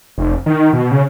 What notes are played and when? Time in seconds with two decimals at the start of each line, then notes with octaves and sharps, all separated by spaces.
0.18 F1
0.46 D#3
0.73 B2
0.91 C#3